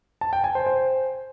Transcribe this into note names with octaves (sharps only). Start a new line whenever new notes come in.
A5
G5
G#5
C5
C5